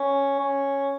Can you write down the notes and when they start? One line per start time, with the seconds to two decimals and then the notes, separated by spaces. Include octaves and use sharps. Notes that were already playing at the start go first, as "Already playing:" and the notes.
Already playing: C#4
0.39 C#4